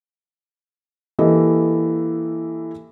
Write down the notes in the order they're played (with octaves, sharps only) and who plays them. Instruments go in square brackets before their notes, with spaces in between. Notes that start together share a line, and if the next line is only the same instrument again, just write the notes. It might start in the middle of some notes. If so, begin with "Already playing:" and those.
[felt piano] E3 A#3 G4 A4 D#5